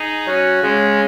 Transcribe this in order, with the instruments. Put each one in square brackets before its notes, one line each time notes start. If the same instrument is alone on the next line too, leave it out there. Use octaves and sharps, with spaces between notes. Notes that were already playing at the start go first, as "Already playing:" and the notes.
Already playing: [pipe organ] D#4 G#4
[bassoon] F#3 [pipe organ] C#4 F#4
[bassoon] C#3 [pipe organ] G#3 C#4